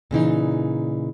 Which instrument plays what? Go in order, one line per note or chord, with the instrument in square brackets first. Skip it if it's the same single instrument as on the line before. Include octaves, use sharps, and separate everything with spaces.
[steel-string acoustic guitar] A#2 C#3 E3 D#4